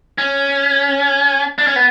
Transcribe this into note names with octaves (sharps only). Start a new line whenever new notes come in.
C#4
D4
C#4
B3